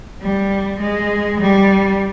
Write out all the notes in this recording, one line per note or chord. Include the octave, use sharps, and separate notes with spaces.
G3
G#3
G3